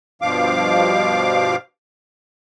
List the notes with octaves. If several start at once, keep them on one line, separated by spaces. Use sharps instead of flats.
G2 B2 F3 F5 D6